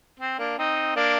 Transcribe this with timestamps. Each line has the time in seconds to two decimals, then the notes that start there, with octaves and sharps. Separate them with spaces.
0.20 C4
0.39 A#3 D4
0.58 C4 D#4
0.96 A#3 D4